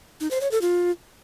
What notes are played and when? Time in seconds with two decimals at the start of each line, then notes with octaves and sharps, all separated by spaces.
0.21 D#4
0.31 C5
0.41 C#5
0.51 A4
0.62 F4